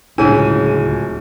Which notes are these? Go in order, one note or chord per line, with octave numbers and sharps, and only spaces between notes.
D1 C#2 D4 E4 G#4 C#5 G#5 D#7